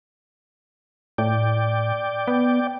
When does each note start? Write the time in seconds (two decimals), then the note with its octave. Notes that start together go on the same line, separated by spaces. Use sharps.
1.18 A2 D5 G5
2.27 B3